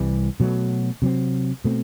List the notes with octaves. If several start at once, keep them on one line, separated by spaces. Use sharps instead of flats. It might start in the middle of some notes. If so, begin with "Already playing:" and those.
Already playing: C2 C3 E3 G3
B2 F#3 A3
C3 F#3 C4
B2 A3 C4